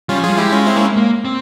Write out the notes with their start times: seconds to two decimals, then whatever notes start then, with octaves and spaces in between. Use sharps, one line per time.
0.09 G3 C#4 F4
0.19 F3 F4 G#4
0.29 G3
0.38 G#3 E4 G4
0.52 C#4 F4
0.66 C4 E4
0.76 A#3 C#4
0.96 A#3
1.25 C4